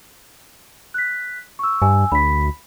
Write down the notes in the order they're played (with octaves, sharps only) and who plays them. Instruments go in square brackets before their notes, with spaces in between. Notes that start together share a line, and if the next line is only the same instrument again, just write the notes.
[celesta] F#6 B6
C#6 E6
[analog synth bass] G2 [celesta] G#5 E6
[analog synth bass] D2 [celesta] B5 B6